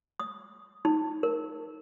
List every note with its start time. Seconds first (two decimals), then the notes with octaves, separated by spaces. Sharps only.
0.20 D#6
0.85 D#4
1.23 A#4